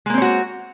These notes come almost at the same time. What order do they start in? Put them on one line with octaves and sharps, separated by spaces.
G#3 A#3 C4 C#5 F#4